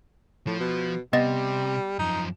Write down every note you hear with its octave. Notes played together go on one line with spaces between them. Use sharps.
A2 F3
B2
C3 G3 B3 D#5 A6
F#2 F3 D#4